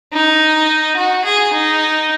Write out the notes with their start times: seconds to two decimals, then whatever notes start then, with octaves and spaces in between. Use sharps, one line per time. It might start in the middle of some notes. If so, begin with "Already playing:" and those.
0.13 D#4
0.96 F#4
1.25 G#4
1.53 D#4